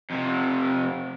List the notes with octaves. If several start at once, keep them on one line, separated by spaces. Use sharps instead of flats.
F2 C3